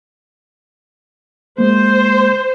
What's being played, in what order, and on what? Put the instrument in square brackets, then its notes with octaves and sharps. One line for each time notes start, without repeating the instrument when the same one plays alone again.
[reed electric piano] G#3 A#3 [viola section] C5